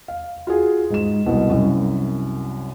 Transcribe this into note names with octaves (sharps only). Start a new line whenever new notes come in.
F5
F4 F#4 G#4
G#2 E7
C2 B2
C2 F#2